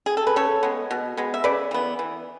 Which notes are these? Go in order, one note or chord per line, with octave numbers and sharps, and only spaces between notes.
G#4
A4
B4
C#3 A4 C#5
G#3 B3
B2
G#3 B3
E5
C#3 B4 D5
E3 B3
E3